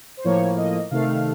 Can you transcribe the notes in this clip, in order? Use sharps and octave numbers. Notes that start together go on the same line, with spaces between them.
C5
A2 F3 A#3 C#5
D#5
C3 D#3 A3 F5